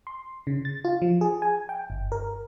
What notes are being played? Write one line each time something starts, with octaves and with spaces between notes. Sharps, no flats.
C6
C#3
A6
F4
F3
G#4
G#5
G5
G1
A#4